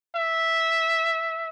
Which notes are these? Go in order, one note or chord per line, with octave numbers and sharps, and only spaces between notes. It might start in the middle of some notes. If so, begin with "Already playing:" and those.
E5